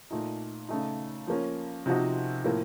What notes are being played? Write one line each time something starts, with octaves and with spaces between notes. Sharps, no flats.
A#2 A3 D#4
C#3 A3 D#4
F3 A#3 C#4
C3 F3 C4 D#4 F#4
A2 F3 A#3